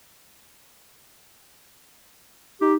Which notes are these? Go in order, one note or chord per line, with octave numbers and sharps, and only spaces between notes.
D#4 G4